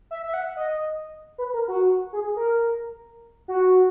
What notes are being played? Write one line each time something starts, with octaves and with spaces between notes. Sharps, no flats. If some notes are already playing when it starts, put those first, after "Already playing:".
E5
E5
F#5
D#5
B4
A#4
F#4
G#4
A#4
F#4